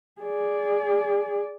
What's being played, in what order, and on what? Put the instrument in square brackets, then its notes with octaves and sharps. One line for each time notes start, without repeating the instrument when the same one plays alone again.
[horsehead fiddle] G#4 D5